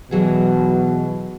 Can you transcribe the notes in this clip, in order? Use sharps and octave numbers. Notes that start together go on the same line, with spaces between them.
B2 E3 F#3 G#4